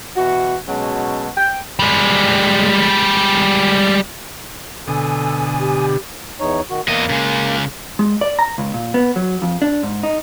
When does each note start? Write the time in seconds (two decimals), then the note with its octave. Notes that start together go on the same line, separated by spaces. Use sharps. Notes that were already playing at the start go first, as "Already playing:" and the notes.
0.16 B2 E3 F#4
0.68 B2 F#3 G#3 C#4 A5
1.36 G5
1.79 G3 G#3
4.88 B2 D3 A4 G#5 D#6
5.60 G4
6.40 E2 D#4 C#5
6.70 D#3 F#4
6.88 E2 A#3 D#5
7.10 C#3 G#3
7.99 G#3
8.21 D5
8.39 A#5
8.58 C#2
8.74 A#2
8.94 B3
9.16 F#3
9.42 F2
9.62 D4
9.83 G#2
10.03 D#4